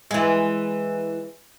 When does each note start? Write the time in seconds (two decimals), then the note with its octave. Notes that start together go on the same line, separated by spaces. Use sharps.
0.11 E3 G#3